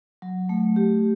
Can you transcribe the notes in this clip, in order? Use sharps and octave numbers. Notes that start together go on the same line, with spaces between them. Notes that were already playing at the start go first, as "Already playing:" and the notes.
F#3
A3
G4